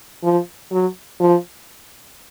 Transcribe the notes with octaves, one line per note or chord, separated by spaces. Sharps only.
F3
F#3
F3